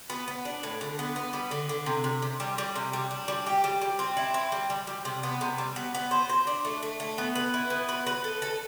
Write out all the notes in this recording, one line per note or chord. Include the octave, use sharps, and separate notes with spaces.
B3
B3
D4
A2
D3
B3
B3
G3
D3
D3
C3
C3
C3
G3
G3
C3
G3
D4
G3
G4
G3
G3
C4
E4
C4
G3
G3
G3
C3
B3
C3
G3
B3
B3
C5
C5
D4
A3
A3
A3
B3
B4
E4
B3
B4
B4
A4
A4